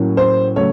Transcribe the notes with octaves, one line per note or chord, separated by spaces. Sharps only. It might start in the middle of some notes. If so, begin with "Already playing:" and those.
Already playing: A2 F#3 A#3 C#4
C5
C#3 F#3 A3 C#5